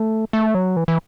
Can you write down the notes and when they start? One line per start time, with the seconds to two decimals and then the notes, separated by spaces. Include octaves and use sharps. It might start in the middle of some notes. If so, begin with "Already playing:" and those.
Already playing: A3
0.33 A3
0.55 F#3
0.77 E3
0.88 E3